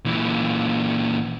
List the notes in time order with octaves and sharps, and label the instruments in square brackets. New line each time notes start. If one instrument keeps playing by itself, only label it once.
[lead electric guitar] A#2 E3